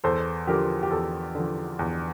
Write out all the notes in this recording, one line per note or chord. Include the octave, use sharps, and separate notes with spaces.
E2 A4 C5
D3 F3 G4 A#4
G4
E2 A4
D3 F3
E2